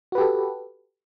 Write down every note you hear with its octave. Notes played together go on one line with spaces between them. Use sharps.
F#4 G4 A4 B4